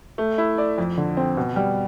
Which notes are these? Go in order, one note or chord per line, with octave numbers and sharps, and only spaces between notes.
A3
E4
D5
F2
D3
C4
B2
G3